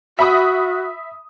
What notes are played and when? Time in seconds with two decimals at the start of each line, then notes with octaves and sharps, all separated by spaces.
0.19 F#4 E5 B5 D#6